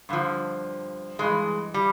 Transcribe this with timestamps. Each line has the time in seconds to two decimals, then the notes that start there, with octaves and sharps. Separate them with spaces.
0.09 G2 D3 F3
1.19 G2 E3 G#3
1.74 G3